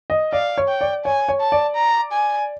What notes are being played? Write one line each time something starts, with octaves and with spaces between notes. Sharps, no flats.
D#5
D5 F5
C#5
G5
D5
C#5 G#5
C#5
A5
D5
A#5
G#5